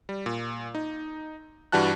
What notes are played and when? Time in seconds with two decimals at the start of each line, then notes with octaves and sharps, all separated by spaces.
0.09 G3
0.26 A#2
0.75 D#4
1.72 G2 E3 G3 F#4 A5 F#6